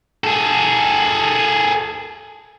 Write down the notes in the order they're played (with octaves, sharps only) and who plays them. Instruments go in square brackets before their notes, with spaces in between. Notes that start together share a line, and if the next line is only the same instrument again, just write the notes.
[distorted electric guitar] G#4 A4